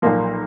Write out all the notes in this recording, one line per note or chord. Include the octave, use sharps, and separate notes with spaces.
B1 A#2 F3 A#3